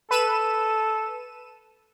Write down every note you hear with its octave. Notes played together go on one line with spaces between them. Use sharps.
A4 B4 D#7 E7